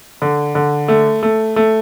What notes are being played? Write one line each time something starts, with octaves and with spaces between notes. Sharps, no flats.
D3
D3
A3
A3
A3